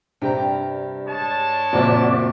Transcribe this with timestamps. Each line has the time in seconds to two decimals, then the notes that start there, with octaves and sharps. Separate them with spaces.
0.21 G2 C3 G4 A#5
1.07 G#3 C#5 A5
1.73 F#1 F2 A#2 A#3 C4 F#4 D5 E5